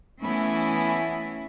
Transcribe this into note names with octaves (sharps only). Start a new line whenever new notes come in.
E3 A3 B3 C#4 E4